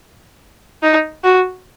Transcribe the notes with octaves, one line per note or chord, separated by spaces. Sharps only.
D#4
F#4